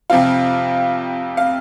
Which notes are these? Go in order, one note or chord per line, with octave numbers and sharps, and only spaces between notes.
F2 C3 F3 C4 F4 F5
F5